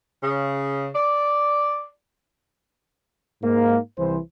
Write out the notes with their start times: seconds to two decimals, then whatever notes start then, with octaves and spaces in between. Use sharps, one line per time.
0.23 C#3
0.95 D5
3.43 G#2 A#3
3.98 C2 E3 C5